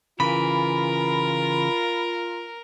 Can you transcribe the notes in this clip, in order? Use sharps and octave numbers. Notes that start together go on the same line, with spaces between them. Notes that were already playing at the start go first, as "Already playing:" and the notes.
C#3 E3 F4 A#4 B5